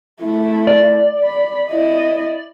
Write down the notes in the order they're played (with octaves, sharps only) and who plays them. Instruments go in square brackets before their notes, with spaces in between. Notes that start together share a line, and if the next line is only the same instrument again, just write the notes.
[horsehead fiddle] A3 E4
[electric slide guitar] D5
[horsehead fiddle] B5
E4 D#5